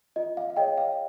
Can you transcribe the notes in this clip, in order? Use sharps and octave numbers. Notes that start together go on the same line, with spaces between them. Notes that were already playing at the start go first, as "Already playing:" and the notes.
F4 D#5
F5
F5
G#4 C#5 D#5 G5
F5